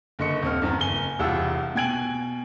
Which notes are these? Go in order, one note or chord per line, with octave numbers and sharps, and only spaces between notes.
F#1 D3 D#5 C#6 C#7
D#1 C4 F6
E2 G2 B3 A#5
F#1 G#5 G7
E1 C2 G3 F4 F#5 E6
B2 G5 G#5 G#6 D7 F#7